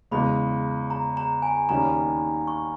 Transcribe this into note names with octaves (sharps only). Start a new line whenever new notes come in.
E2 C#3 G#3 B5
A#5
A#5
G#5
D#2 D#3 G3 C#4 A#5
C#6